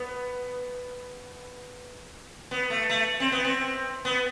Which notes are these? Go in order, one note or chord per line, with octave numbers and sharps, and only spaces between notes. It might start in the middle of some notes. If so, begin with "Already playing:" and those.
Already playing: B3
B3
A3
A3
C4
B3
C4
B3